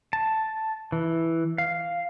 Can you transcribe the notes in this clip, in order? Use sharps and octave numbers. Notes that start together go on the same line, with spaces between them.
A5
E3
F5